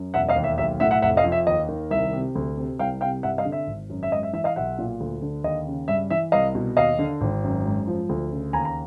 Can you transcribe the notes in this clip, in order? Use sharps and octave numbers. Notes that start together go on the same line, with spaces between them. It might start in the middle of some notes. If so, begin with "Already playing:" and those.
Already playing: F#2
E1 E5 F#5
D#5 F5
D#2
E5
B1 E5
A2 E5 F#5
E5 F#5
F1 E5 F#5
D#5 F5
F2
E5
D#2 D#5
D#3
C2 E5
C3
D2
C3
C2 F5 G5
C3 F5 G5
G2 E5 F#5
D#5 F5
D3
E5
G#1
F#2
E5
G#2 D#5
E5
E3 E5
D#5 F5
B1 E5 F#5
A#2
D2
D3
D#2 D#5
C#3
G2 E5
E3 E5
C2 D#5 F5
B2
D#2 D#5 F5
D3
G#1
F#2
G#2
F3
D2
C#3
D#2 G#5 A#5
A#5